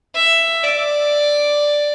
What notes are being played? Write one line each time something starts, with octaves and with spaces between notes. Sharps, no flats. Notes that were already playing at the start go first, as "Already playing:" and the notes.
E5
D5